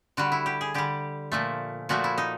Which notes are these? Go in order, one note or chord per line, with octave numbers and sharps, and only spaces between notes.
D3 G3 F#4
E4
G4
G#4
D3 G3 G4
A#2 F3 A3
A#2 F3 A3 F#4
E4
D#4